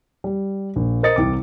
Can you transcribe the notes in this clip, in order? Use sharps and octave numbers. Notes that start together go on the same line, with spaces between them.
G3
A#1
A#4 C5 D#5 D#6 A6 C#7
C2 C3 E3 D6